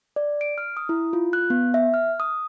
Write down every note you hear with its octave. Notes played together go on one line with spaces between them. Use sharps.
D5
D7
F6
D#6
E4
F4
F#6
B3
E5
F6
D#6